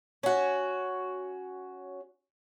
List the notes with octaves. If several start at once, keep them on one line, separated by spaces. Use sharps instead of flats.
C#4 F#4